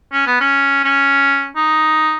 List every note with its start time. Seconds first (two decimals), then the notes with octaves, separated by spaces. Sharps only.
0.13 C#4
0.27 B3
0.41 C#4
0.85 C#4
1.56 D#4